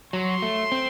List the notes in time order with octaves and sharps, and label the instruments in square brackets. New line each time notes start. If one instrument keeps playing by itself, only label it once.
[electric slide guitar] F#3 [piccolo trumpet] C6
[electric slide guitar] A3
C4